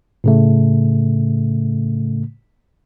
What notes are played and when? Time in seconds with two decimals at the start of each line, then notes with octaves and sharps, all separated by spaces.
0.24 A2 C#3 A3